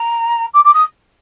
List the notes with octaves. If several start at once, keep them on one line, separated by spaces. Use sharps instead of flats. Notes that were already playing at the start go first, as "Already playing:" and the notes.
Already playing: A#5
D6
D6
D#6